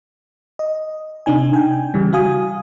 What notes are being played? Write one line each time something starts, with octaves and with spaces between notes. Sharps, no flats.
D#5
C3 D4 D#4 G#5
G5 G#5
C#3 E3 G3
F#4 F5 G#5 D#6